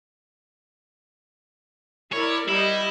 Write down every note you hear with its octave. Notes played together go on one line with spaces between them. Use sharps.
E4 A#4 C#5 D5
G3 E4 D#5